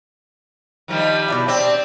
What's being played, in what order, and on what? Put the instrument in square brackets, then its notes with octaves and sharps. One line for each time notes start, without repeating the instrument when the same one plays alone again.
[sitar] D#3 F3 G3
[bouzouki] B2 D4 E4
[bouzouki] G3 D4 [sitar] C4